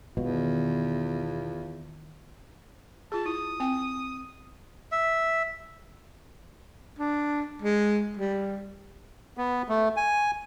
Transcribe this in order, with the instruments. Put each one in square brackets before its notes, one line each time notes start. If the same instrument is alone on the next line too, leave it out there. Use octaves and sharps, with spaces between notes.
[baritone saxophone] E2 [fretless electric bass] B2 [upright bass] D#3 [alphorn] F4
[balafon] F4 G#4 [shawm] A5
[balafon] E4 [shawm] D#6
[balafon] C4 G5
[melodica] E5
[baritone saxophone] D4
G#3
G3
[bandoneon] B3
A3
G#5